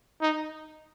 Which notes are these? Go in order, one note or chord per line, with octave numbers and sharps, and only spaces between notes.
D#4